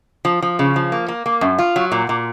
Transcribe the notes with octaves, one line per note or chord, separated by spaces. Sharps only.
F3
F3
C#3
F3
A#3
A#3
A#3
F#2
F4
F#3
A#2
A#2